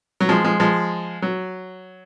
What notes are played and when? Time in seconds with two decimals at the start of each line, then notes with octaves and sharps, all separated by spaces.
0.20 F#3
0.29 F3 G#3
0.44 F3 G#3
0.60 F3 G#3
1.22 F#3